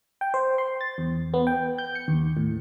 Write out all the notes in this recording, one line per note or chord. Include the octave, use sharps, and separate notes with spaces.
G5
C5
C6
A6
E2
B3
G5
G6
C#7
D#2
A2